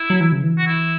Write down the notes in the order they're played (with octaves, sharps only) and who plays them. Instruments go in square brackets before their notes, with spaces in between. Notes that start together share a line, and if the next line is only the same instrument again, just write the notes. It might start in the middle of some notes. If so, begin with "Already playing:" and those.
Already playing: [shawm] E4
[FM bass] F#3
E3
C#3
E3
[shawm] F#4
E4